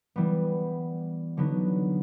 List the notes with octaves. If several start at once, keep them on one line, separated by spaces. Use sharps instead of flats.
E3 G3 B3
D3 F#3 B3 D#4